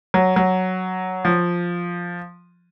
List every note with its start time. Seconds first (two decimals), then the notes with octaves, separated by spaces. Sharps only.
0.14 F#3
0.36 F#3
1.25 F3